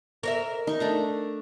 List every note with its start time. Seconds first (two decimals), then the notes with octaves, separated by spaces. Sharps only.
0.23 A#4 C#5 E5
0.67 D#4 C#6
0.80 A3 D4 A#5